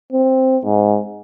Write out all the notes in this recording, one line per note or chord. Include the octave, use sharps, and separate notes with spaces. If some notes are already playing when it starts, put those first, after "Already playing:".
C4
G#2